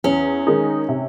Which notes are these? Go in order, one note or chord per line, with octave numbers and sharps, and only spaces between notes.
E2 C#4
D#3 G#3 D#4
C3